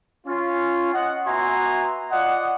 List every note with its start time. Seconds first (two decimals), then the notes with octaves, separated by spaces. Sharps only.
0.27 C#4 F4
0.94 D#5 F#5
1.26 B3 F#4 E5 G#5 A#5 C6
2.12 F4 D5 D#5 F#5